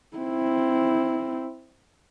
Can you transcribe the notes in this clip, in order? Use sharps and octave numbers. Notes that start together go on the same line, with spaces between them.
C4 E4